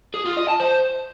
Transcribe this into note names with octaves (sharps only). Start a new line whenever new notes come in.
G#4
F4
D#5
A5
C5